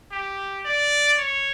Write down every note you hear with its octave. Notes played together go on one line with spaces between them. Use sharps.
G4
D5
C#5